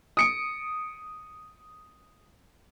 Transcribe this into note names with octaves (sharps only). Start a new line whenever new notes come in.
D#6 C#7 D7